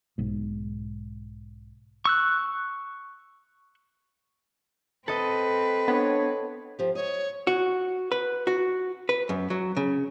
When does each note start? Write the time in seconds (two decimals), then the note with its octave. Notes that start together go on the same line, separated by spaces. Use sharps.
0.18 B1 G#2
2.05 C#6 E6 F#6
5.08 C4 A4 B4 D#5
5.88 B3 D4 C#5
6.79 F3 G4
6.95 C#5 D#5
7.47 F#4
8.12 B4
8.47 F#4
9.09 B4
9.29 F#2
9.50 F#3
9.77 C#3